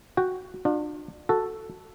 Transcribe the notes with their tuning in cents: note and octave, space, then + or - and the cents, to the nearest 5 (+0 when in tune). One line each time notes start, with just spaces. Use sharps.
F#4 +0 G5 +0
D4 +35 F4 +40
F#4 +0 A4 +0